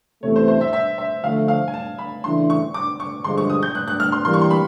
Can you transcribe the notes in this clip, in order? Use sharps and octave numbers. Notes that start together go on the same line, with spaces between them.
E2 C3 E3 A3 C#5
C5
C5
E5
E5
E5
D3 F3 A3 F5
F5
G#5
A5
B5
C#3 E3 A3 D4 C6
C#6
D6
C#6
G2 D3 F3 G#3 C6
C#6
D#6
G6
F#6
F#6
F6
C6
E3 G3 A#3 C6
C#6
C6
B5